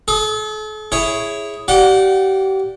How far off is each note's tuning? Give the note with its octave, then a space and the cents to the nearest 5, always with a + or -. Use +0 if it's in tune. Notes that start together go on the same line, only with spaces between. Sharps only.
A4 -45 D#6 +0
E4 +0 G#4 +0 C#5 +0
G4 -35 D5 +0 F#5 -25